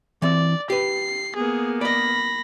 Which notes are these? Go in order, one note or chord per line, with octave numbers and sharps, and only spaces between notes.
E3 C4 D5
G4 B4 C7
A#3 B3 G#4
D5 D#5 B5 A#6